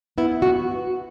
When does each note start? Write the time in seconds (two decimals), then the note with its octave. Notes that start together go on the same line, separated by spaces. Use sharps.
0.18 B3 E4
0.42 F#4